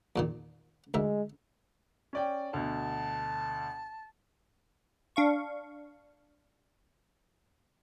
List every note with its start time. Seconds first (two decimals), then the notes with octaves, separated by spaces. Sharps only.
0.16 E2 A#2 D#3
0.94 D2 G#3 A#4 E5
2.13 C#4 D5 G5
2.53 D2 B2 A5
5.16 D4 F5 C#6